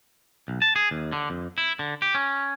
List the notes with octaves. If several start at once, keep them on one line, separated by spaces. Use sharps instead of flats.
B1
A5
G#4
D#2
D3
F2
E4
D3
G4
C#4